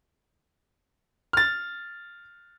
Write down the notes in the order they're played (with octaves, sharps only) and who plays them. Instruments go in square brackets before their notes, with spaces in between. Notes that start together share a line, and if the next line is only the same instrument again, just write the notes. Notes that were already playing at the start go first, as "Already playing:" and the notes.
[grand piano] F6 A6